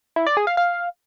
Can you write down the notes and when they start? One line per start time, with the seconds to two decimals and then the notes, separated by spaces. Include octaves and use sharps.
0.16 E4
0.27 D5
0.37 G#4
0.47 F5
0.57 F5